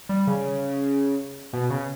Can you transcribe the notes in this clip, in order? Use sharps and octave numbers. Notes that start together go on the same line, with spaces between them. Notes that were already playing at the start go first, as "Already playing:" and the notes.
G3
C#3
B2
C#3